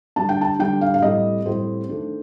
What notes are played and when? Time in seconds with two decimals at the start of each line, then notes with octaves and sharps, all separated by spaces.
0.16 D3 G3 D4 A5
0.29 G5
0.41 A5
0.59 D3 G3 D4 G5
0.81 F5
0.94 F5
1.02 A2 G3 C4 D#5
1.46 A2 G3 C4 C5
1.89 D#3 A3 D4